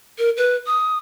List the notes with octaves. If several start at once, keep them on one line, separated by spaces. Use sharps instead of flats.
A#4
B4
D#6